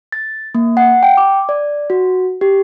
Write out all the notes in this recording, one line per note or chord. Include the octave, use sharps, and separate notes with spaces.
A6
A#3
F#5
G5
D6
D5
F#4
G4